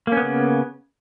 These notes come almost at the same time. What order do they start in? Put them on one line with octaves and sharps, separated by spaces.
A#3 C#4 B3 C#3